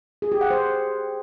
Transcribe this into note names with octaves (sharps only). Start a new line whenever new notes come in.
G#4
G4
F#5
C5